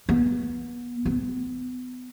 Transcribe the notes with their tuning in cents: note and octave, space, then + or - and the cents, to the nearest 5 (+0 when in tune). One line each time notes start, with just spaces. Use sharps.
B3 -25
B3 +30